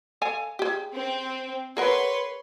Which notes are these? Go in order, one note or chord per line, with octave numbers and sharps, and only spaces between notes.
A4 F5 G#5
G4 G#4
C4
G#4 A#4 B4 C#5 F#5 C6